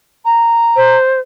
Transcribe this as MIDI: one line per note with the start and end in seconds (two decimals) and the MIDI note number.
0.25 0.96 82
0.76 1.20 72